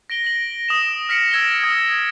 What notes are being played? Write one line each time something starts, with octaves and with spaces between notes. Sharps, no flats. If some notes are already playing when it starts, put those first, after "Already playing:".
A#6 D7 G7
A#6 F#7
D#6 E7
F6 A#6 B6 C#7 D7 F#7
E6 G#6 A#6 E7 G7
D#6 G#6